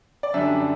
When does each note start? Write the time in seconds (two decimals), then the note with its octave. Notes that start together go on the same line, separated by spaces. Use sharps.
0.23 D5
0.34 F#2 D3 G3 D4 E5